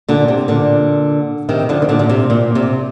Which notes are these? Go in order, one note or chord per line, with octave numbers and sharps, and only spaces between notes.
A#2 D3
C3
A#2 D3
C3 D#3
D3 F3
D#3
A#2 D3
A#2
C3
A#2
C3